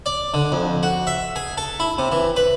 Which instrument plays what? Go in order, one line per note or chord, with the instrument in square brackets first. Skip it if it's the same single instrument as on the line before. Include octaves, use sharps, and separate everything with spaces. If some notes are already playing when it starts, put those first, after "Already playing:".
[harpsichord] D5
D3
F2
F#4
E5
G#4
A4
E4
C3
E3
B4